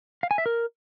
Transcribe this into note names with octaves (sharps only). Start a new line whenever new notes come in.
F5
G#5
E5
A#4